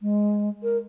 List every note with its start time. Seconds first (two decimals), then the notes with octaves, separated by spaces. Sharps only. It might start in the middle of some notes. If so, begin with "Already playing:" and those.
0.01 G#3
0.63 A#4